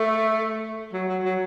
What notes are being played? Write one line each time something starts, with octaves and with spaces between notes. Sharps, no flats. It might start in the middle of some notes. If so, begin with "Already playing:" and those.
Already playing: A3
F#3
F#3
F#3